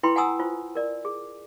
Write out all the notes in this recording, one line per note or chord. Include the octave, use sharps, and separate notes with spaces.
E4 A4 B4 G5 B5 C6
F#5 G#5 A#5 D#6 E6
F4 C5
A#4 D5
G#4